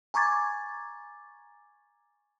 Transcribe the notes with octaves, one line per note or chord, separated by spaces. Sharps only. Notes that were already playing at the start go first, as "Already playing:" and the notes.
G#5 A#5 C#6 D6 G#6 A6